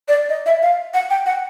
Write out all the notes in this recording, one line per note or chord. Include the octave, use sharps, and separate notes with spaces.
D5
D#5
E5
F5
F#5
G5
F#5